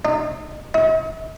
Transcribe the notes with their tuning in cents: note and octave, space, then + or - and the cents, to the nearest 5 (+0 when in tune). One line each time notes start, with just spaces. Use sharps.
D#4 -30
D#4 +45